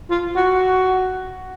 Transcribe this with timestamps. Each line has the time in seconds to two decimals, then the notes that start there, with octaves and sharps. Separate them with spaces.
0.10 F4
0.36 F#4